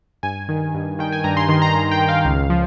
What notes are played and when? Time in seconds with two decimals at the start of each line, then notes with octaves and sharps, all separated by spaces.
0.23 G2 G#5
0.49 D#3
0.74 G2
0.99 D#3 G5
1.12 G#5
1.24 G2 A#5
1.37 C6
1.49 D#3 C6
1.62 A#5
1.75 G2 A#5
1.91 G5
1.99 D#3
2.09 F5
2.25 C#2
2.50 F3